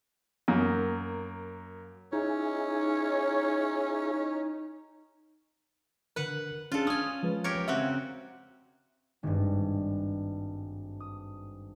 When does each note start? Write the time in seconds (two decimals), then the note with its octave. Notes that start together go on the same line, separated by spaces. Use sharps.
0.48 F#2 A#3
2.13 C#4 D#4 E4 G#4 C#5
6.16 D3 A#4 B4 F#5
6.72 C#4 D4 F4 G#4 A4
6.87 C#4 G#5 D#6
7.23 F3 G#3 B4
7.44 G4 A#4 C#5
7.68 C#3 C4 F#4 E5 F#5
9.23 G#1 G2
11.00 D#6